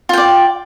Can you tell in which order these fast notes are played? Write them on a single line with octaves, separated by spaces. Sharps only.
F4 G5 D5